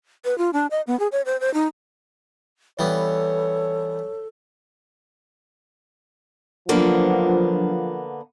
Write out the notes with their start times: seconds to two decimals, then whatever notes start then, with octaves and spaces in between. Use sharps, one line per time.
0.25 B4
0.38 F4
0.53 D4
0.71 D#5
0.87 B3
1.00 G#4
1.12 C#5
1.26 C5
1.40 C5
1.54 D#4
2.79 E3 G3 B3 A4 C#5
6.69 D3 F3 F#3 A#3 B3 D4 F4